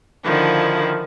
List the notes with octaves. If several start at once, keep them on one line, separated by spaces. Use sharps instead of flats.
D3 D#3 F3 E4